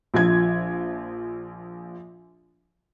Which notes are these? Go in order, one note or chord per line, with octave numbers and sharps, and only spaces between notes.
A#1 F3 G#6